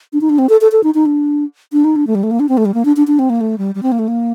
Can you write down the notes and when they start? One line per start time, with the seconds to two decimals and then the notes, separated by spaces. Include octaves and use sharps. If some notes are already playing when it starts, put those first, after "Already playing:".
0.13 D4
0.21 D#4
0.29 D4
0.38 C4
0.49 A4
0.61 A4
0.72 A4
0.83 D#4
0.94 D#4
1.06 D4
1.73 D4
1.84 D#4
1.96 D4
2.07 A3
2.15 G3
2.23 A3
2.31 A#3
2.40 D4
2.49 C4
2.57 A3
2.65 G3
2.74 A#3
2.85 D4
2.96 D4
3.07 D4
3.19 C4
3.30 A#3
3.41 A3
3.58 G3
3.75 G3
3.83 C4
3.92 A#3
3.99 A3
4.08 A#3